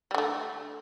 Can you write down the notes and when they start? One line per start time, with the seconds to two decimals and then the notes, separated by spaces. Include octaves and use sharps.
0.11 G3
0.14 D3
0.18 A3